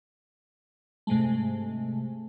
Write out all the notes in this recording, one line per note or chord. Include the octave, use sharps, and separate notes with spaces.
G#2 C3 G#3 A3